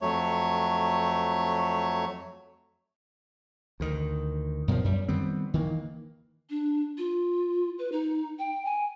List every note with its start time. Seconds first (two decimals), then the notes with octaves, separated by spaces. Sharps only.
0.01 F2 F#3 A3 C#5
3.80 D2 D#3
4.68 F#2 B2 D#3 F3
4.84 F#2 G3
5.08 D#3 G3 B3 C4
5.54 D#3 E3 A#3
6.50 D4
6.98 F4
7.79 B4
7.92 D#4
8.39 G5
8.65 G#5